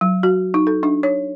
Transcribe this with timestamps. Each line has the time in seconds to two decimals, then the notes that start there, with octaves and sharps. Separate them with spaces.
0.01 F#3
0.23 F#4
0.54 D#4
0.67 A4
0.83 D4
1.03 C#5